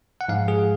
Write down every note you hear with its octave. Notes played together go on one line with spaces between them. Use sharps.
F#5
G#2 F3 G#3 F5
G#4